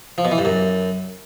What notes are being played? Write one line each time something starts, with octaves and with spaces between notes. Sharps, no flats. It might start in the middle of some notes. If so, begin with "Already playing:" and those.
F3
B2
E3
G2
F#2